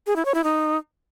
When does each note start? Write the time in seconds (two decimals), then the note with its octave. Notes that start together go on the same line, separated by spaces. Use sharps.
0.07 G#4
0.16 E4
0.25 C#5
0.34 E4
0.44 D#4